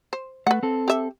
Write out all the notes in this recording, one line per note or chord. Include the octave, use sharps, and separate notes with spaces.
C5
A3 B4 F#5
C4 A4
G4 E5